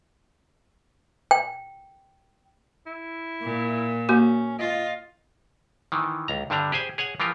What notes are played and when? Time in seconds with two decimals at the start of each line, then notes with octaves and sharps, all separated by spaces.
1.31 G5
2.86 E4
3.42 A#2
4.09 A#3 C#4 F#4
4.59 F4 D#5
5.92 D#3 E3
6.28 C#2 A#5
6.50 G2 D3 G3 D4 A#5
6.72 G4 G#4 C5 G#5
6.98 G#4 C#5 F#5 G#5
7.20 E3 F3 F4 G4 A#4